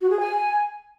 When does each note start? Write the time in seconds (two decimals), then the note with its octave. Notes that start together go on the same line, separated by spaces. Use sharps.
0.01 F#4
0.10 G#4
0.19 G#5